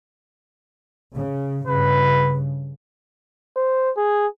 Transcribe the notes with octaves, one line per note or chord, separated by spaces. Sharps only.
C#3
G2 C#3 B4
C5
G#4